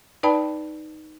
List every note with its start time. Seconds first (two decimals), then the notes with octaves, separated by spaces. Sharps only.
0.23 D#4 B4 D5 G5 A5 B5